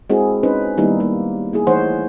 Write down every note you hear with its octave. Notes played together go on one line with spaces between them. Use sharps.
G#3 C4 E4 F#4 G#4 A#4
C4 C#4 D#4 B4 C5 D#5
D#3 G3 A#3 B3 D#4 E4
A#3 D#4
A#3 E4 G#4
E3 A3 D#4 C5 C#5 F#5